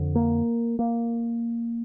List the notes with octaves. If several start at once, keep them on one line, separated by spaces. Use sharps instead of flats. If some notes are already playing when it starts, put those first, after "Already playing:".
Already playing: F2 D3
A#3
A#3